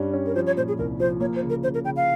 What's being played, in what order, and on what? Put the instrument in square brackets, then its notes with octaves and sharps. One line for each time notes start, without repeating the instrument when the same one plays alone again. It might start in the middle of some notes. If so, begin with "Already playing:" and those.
Already playing: [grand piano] G2 G3 C#4
C#4
[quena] A#4
[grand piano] F3 [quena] C5
[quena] C#5
[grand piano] A#2 [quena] C5
[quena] G#4
[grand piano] C2 [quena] A#4
[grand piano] F3 [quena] C5
[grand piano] A#3 [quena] C#5
[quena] C5
[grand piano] C#3
[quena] A#4
[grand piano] C#3 [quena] C5
[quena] A#4
[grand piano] C#3 [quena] G5
[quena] F5